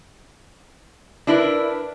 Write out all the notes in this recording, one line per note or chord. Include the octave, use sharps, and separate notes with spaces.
D4 E4 A#4 B4